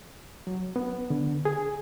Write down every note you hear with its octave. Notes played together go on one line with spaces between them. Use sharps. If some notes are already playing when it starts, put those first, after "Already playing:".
F#3
B3
D3
G#4